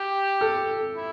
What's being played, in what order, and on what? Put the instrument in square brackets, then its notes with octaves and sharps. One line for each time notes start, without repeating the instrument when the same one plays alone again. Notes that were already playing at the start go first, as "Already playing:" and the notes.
Already playing: [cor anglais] G4
[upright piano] A4
[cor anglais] E4